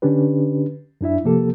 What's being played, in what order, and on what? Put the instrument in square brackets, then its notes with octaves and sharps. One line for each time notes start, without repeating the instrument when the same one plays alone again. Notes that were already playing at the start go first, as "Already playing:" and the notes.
[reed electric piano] D3 C#4 D4 G4 B4
F#2 D4 E4 E5
C3 F3 A#3 G4 A4